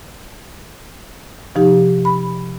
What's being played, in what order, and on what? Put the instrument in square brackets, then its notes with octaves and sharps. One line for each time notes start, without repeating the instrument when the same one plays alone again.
[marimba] C3 F3 D#4 G4
B5